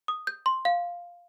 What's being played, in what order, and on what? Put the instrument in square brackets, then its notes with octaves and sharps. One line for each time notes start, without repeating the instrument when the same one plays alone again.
[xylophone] D#6
G6
C6
F5